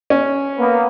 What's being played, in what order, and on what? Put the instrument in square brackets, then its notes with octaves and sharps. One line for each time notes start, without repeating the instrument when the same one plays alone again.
[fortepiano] C#4
[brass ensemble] A#3 B3